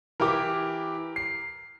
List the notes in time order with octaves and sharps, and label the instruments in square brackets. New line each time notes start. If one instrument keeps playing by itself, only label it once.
[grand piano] E3 E4 G4 [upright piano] A#4 D6
[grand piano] C7